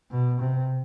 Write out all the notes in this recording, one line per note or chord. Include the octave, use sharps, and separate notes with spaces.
B2
C3